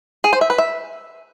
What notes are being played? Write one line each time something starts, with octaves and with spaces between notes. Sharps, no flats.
G#4
C5
E5
B4
E5